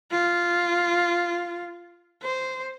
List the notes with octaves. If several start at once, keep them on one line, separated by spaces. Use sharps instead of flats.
F4
C5